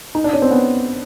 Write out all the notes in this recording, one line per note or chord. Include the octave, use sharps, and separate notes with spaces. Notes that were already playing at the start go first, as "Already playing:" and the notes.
D#4
D4
C#4
C4
B3